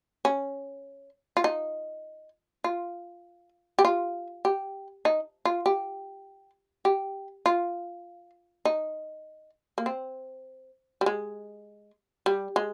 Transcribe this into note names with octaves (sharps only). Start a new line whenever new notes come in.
C#4
F4
D#4
F4
G4
F4
G4
D#4
F4
G4
G4
F4
D#4
A#3
C4
G3
G#3
G3
G#3